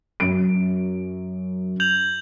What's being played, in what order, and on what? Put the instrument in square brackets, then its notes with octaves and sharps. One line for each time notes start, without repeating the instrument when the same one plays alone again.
[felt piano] F#2 D7
[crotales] G6 F7 F#7